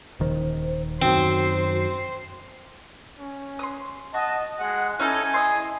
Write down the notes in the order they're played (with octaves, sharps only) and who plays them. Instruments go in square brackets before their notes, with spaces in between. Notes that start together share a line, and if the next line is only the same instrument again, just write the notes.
[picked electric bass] D#1 D#3 [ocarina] C5
[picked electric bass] F#2 D#3 [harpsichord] C4 [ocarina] F#4 [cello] C5
[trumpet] C#4
[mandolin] C6 D#6
[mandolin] F#4 [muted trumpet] D#5 [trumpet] A5
[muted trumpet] G#3 [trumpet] F#5
[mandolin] C#4 D#4 A4 [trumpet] E4 [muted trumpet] G#5
[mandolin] G#4 D#5 C6